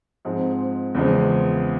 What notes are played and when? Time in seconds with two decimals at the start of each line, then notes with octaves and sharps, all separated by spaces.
0.25 G#2 F3 G#3 C4
0.95 E2 C#3 F3 G#3